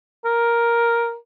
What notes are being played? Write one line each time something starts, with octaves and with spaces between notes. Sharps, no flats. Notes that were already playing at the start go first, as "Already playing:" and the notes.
A#4